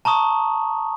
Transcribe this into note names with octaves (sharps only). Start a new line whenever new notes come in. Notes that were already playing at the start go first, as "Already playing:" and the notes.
A5 A#5 C#6 D#6